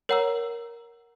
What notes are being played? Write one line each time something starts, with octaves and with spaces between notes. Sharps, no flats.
A#4 C#5 F#5 A#5 E6